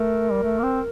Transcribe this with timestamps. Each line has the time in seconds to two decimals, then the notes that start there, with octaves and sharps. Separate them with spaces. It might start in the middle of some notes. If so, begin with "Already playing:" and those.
Already playing: A3 A#4
0.32 G3
0.43 A3
0.59 A#3
0.63 C4